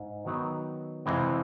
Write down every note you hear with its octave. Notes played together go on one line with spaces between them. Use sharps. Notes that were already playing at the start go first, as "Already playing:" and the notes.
Already playing: G#2
D#3 F#3 B3 D#4
F2 C3 E3 G#3 C4